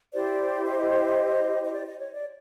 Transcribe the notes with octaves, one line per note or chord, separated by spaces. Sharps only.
E4 G4 C5 D5
D#5
D#5
D5
D#5
C#5
D5